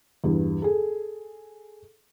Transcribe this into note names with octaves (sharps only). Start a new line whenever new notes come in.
E2 G2
G#4 A4